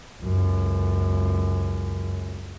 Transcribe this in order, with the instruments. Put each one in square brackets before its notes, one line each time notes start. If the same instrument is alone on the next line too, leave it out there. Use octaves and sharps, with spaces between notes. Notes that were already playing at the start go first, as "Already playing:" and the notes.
[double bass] C#2 F#2